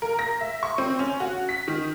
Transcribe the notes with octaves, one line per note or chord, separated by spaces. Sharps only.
A#4
A#6
E5
C#6
C4
C#4
F#4
B6
D#3